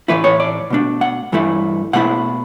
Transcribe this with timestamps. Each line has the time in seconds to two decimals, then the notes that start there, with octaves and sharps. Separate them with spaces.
0.08 A2 E3 A3 E4 B4
0.24 C#5
0.40 D5
0.70 B2 A3 D4
1.01 F#5
1.32 G2 E3 A3 E4
1.93 B2 A3 E4 F#5